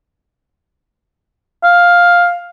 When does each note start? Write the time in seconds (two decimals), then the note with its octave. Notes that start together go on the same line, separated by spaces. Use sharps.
1.64 F5